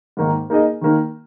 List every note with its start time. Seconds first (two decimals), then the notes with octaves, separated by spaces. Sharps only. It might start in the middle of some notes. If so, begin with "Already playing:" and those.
0.17 G#2 D#3 A#3 D#4
0.50 A#3 D#4 G#4 D#5
0.81 D#3 A#3 D#4